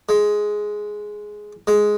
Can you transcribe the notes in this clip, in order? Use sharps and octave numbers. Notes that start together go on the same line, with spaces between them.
G#3
G#3